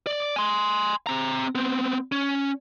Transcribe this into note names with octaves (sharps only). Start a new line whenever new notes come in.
D5
G#5 C6
C4 A#5
B3 C4
C#4